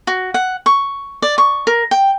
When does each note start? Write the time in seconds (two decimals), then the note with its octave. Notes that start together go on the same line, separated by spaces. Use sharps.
0.07 F#4
0.34 F#5
0.66 C#6
1.22 D5
1.38 C#6
1.67 A#4
1.91 G5